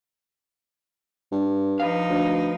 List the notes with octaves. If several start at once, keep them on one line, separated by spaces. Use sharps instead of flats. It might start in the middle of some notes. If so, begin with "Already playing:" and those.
G2
F3 D#4 B4 F5
D2